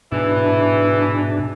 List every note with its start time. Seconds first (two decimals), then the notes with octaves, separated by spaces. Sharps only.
0.12 G#2 B2 E3 D4